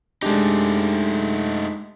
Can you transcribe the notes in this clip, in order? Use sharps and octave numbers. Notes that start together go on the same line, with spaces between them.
G#3 A3 D4 D#4 G4